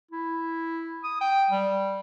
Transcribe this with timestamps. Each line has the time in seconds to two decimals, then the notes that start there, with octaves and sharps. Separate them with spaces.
0.11 E4
1.04 D#6
1.21 G5
1.50 G3